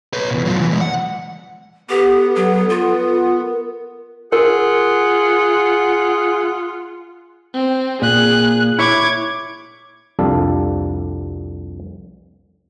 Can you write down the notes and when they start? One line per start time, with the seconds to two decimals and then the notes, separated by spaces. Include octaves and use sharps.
0.13 B4 C#5
0.31 E2 B2
0.45 F#3 F4
0.57 B2 E3
0.69 E3 G#3
0.81 F#5
1.89 B3 G4 A4
2.36 F#3
2.70 F4
3.43 A#4
4.32 F4 G#4 A#4 F#5
7.54 C4
8.02 A#2 G#4 F#6
8.79 E4 C#5 D6 G#6
10.19 C2 F2 G3 D4 A4 F5